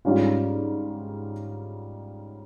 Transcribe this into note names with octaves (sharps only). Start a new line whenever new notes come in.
G#2 G3 C#4 F4